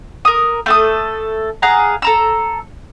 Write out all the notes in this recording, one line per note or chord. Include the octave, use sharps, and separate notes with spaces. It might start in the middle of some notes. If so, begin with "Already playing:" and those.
A#4 D#6
A3 A4 D#6
G#4 F5 F#5 A#5
A4 A#5 E6